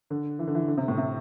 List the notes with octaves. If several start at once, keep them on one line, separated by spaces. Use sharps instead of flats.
D3
E3
D3
E3
D3
C3
A2
C3